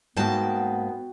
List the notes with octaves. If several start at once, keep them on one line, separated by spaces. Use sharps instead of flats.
G#2 A#3 B3 F#4 G5 A5